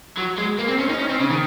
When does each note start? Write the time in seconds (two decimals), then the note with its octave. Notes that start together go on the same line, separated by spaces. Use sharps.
0.18 F#3
0.38 G#3
0.59 A#3
0.68 C4
0.79 C#4
0.89 D#4
0.99 C#4
1.09 C4
1.20 C#3
1.30 D#3